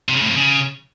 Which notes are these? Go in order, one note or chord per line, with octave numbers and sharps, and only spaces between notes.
C3
C#3
A2
F2
C#3